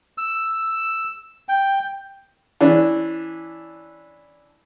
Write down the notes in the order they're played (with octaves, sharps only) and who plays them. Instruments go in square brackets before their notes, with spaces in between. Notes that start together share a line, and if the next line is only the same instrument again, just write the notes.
[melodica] E6
G5
[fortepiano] E3 C#4 D4